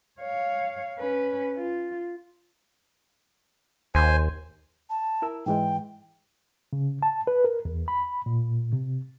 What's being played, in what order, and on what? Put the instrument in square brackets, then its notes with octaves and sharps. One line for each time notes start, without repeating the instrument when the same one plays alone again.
[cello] C#5 F5
C#4 B4
F4
[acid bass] D#2 [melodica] C5 G#5
[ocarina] A5
[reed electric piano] E4 A#4 E6
[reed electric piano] G#2 E3 G#3 [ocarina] G5
[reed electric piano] C#3
A5
B4
A#4
E2
B5
A#2
C3